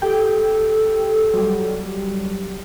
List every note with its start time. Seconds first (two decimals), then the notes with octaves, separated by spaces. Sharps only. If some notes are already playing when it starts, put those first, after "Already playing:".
0.02 G4 A4 G5
1.34 F#3 G3